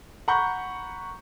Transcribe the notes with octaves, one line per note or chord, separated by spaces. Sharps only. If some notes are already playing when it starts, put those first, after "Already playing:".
F#5 A#5 B5 C#6 G6